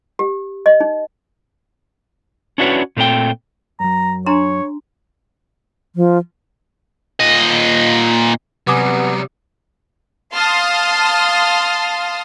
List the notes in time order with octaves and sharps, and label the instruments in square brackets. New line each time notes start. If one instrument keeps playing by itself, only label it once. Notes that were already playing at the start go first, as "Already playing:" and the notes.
[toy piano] G4
D#5
D#4
[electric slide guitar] C#4 D4 E4 F#4 B4 C#5
A#2 A3 C4 A#4 G5
[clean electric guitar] F#2 F#3 [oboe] A#5
[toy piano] D4 A#5 C6 [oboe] C#5
[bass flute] F3
[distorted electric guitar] A#2 D#5
[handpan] C3 [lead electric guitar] F#3 G3 [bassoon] B3 [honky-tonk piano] G#5 D6 D#6
[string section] F5 A5 C6 D#6 F6